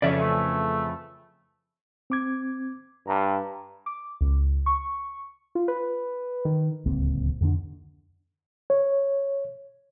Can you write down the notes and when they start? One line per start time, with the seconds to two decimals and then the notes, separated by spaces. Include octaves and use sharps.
0.02 F2 C#3 E3 C#4 B4 C#5 D5 E5
0.20 A3
2.10 C4 D6 G#6
3.07 G2 A#5
3.86 D6
4.21 C#2
4.66 C#6
5.55 F4
5.68 B4
6.45 D#3
6.86 D1 C#2 A#3 C4
7.41 F2 D3 C4 D4
8.70 C#5